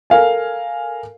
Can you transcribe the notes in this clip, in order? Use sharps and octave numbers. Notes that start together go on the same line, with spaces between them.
A4 A#4 F5 G#5